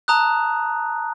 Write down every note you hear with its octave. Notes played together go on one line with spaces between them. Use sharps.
A5 A#5 D#6 F#6